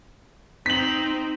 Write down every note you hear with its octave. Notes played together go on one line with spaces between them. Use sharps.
C4 D#4 B6 F#7